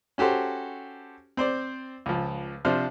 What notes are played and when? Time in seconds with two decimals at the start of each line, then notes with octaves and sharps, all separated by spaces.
0.18 C#4 F#4 G4 A4 C5
1.37 C4 C5 D5
2.06 C#2 F3
2.65 C3 F3 D4 C5 F6